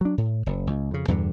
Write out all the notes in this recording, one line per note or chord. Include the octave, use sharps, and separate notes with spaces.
F#3 D4
A2
F#1
C#2
F2 C#3
E2 G2 B2 D3